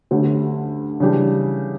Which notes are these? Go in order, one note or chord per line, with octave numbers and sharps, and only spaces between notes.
D2 D3 A3 C#4 G4
C#3 E3 G3 D4 G4